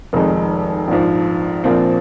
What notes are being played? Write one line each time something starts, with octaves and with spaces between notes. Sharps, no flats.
F1 F2 D#3 G#3 D#4
A#1 G#2 F3
A#1 A#2 F3 C4